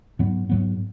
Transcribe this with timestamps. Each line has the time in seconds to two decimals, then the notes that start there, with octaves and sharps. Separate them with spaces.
0.19 G#2 F#3 B3
0.49 G#2 F#3 B3